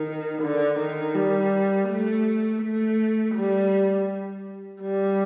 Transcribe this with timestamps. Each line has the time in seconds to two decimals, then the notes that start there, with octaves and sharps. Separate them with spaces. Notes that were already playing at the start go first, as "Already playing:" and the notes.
Already playing: D#3
0.42 D3
0.79 D#3
1.15 G3
1.89 A3
2.62 A3
3.35 G3
4.81 G3